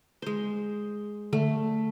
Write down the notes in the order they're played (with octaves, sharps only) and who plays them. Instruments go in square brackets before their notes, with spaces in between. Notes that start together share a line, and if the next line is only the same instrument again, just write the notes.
[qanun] G#3 C5
[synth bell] D3 [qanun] A3